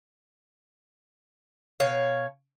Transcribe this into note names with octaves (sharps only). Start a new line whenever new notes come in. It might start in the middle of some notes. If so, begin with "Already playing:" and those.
B2 C#5 F5